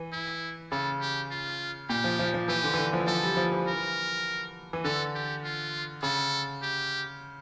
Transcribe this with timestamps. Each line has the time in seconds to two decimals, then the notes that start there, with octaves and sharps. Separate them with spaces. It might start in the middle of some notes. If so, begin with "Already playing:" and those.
Already playing: E3
0.13 E4
0.72 C#3 A4
1.01 G4
1.31 F4
1.89 A#2 G4
2.04 F3
2.19 F3
2.34 F3
2.48 E3 G4
2.64 D3
2.74 E3
2.78 D3
2.93 F3
3.00 E3
3.07 F3 A4
3.23 G3
3.34 G3
3.37 F3
3.52 E3
3.67 A#4
4.73 E3
4.84 D3 A4
5.15 G4
5.43 F4
6.03 C#3 A4
6.62 G4